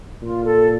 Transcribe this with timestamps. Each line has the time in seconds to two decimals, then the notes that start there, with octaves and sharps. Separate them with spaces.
0.22 A#2 F4
0.45 A4